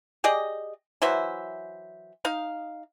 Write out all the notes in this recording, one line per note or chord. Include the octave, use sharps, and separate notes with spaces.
G4 G#4 D5 D#5
E3 F#3 C5 E5
D#4 F5